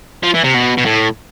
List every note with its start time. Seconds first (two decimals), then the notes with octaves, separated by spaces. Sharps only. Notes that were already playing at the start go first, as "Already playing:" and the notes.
0.23 F3
0.34 E3
0.44 C3
0.54 B2
0.77 B2
0.85 A2